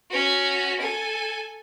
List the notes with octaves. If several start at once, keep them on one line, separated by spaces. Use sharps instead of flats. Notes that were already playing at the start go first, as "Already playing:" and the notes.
C#4 F#4
A4 G#5